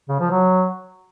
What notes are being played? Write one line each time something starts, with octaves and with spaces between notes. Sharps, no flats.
C#3
F3
F#3